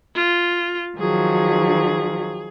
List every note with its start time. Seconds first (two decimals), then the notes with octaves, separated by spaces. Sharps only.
0.15 F4
0.99 D#3 F3 F#3 G#4